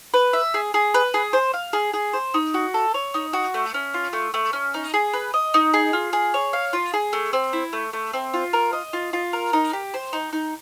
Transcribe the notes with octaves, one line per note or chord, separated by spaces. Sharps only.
B4
E5
G#4
G#4
B4
G#4
C5
F5
G#4
G#4
C5
D#4
F#4
A4
C#5
D#4
F#4
A3
C#4
F4
A3
A3
C#4
D#4
G#4
B4
D#5
D#4
G#4
F4
G#4
C#5
F5
F4
G#4
A3
C4
E4
A3
A3
C4
F4
A#4
D#5
F4
F4
A#4
D#4
G4
C5
D#4
D#4